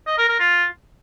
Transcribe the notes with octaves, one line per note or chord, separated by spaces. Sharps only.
D#5
A#4
A#4
F4